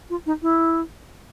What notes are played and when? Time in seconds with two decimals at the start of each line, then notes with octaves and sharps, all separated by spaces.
0.10 F4
0.26 D#4
0.42 E4